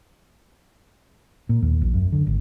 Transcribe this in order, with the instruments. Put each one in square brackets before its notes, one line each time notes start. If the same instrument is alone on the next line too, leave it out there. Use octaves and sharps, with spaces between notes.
[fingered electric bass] A#2
D#2
A#1
F#2
D3
G#1